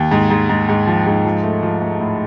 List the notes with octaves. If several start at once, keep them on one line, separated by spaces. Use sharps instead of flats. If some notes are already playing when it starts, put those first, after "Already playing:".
Already playing: D#2
G#2
G#2
G#2
G#2
F3
G#2
F3
A3
F3
A3
A2